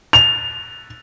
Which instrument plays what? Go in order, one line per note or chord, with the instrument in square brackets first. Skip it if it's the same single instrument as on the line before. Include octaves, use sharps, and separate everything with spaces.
[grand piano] F7